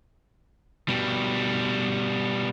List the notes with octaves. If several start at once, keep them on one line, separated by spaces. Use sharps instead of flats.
B2 G3